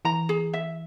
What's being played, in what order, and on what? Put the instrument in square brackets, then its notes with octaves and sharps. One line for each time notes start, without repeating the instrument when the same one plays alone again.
[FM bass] E3 [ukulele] A#5
[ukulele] G#4
E5